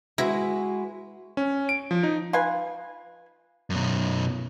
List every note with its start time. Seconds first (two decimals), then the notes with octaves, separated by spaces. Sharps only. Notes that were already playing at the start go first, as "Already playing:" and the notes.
0.18 G#3 E4 F#4 B4
1.37 C#4
1.69 D7
1.91 F3
2.03 D#4
2.33 F4 B4 G#5
3.70 F#2 B2